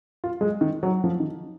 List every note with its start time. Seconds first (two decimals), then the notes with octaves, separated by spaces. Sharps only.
0.24 F4
0.41 G#3
0.61 D#3
0.83 F#3
1.04 F3
1.20 D#3